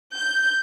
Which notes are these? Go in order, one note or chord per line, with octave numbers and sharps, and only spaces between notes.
G6